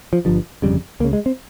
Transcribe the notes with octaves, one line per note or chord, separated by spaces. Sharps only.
F3
G1 G2 F3
G1 F2 C#3 G3
C#2 C#3 A#3
G#3
C4